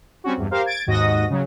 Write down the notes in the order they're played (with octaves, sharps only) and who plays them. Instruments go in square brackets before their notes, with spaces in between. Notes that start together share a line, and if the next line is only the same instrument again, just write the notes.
[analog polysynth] G3 C4 C#4 F#4
E2 G2
G4 A#4 C5 F5
G#6 A6 D7
D#2 G#2 F#4 D#5 D#6 A#6
C#3 F#3